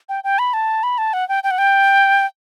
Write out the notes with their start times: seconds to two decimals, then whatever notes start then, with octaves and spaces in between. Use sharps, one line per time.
0.09 G5
0.24 G5
0.39 B5
0.54 A5
0.83 B5
0.98 A5
1.13 F#5
1.29 G5
1.44 G5
1.51 F#5
1.58 G5